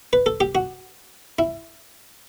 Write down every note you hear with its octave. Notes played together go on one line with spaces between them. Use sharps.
B4
A4
G4
F#4
E4